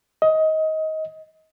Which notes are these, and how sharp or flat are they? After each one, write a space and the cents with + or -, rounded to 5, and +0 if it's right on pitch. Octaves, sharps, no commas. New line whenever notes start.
D#5 +20